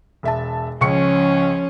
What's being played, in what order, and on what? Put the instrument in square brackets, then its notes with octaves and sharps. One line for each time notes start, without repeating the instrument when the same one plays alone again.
[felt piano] E1 E5 A5
[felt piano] C#2 C#6 C#7 [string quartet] F3 C#4